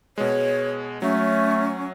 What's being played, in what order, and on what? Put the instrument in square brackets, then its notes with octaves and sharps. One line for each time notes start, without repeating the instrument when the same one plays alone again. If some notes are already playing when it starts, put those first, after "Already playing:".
[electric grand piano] B2 G#3 [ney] C#5
[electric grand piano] F#3 [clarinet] A3 [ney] C#4